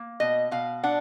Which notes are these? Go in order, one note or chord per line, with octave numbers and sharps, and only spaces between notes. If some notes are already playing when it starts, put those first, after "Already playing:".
Already playing: A#3
B2 D#5
B2 F5
D4 F#5